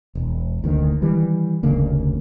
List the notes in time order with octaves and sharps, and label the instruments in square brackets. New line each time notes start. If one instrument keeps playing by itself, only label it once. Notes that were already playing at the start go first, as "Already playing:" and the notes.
[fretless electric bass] E1
F1 D2 D#3 A#3
D#3 E3 G3
F1 D2 C#3 A#3